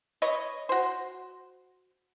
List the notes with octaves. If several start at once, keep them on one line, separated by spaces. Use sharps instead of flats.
B4 C#5 D#5
F#4 C5